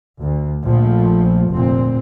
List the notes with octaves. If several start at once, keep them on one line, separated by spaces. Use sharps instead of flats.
D2
A#1 F3 A3
F1 D2 A#2 C4